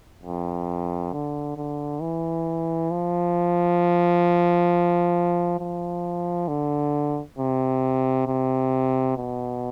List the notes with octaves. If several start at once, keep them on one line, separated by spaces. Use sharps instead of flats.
F2
D3
D3
E3
F3
F3
D3
C3
C3
B2